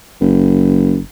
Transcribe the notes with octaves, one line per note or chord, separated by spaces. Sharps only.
F#1